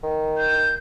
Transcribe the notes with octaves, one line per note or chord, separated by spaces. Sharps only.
D#3
G6